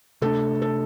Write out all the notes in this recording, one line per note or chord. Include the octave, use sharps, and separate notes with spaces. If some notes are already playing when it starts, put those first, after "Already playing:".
C3 A3 D4 A4
A4